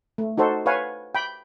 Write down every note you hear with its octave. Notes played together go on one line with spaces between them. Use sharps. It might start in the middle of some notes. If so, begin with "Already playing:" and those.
A3
D#4 F#4 A4 C5
B4 C#5 F5 F#5 G#5
G5 B5